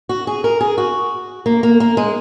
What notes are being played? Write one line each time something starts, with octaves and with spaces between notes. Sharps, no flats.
F#4
G#4
A#4
G#4
F#4
A#3
A#3
A#3
G#3